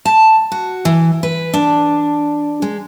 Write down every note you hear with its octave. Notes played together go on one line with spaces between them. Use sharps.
A5
F#4
E3
B4
D4
G#3